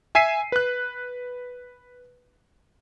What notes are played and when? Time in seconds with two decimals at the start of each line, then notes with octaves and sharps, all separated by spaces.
0.15 E5 G#5 E6 B6 C7 D#7
0.52 B4 F#6